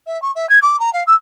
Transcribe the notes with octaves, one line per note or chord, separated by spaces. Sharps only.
E5
C#6
E5
G#6
D6
A#5
F5
E6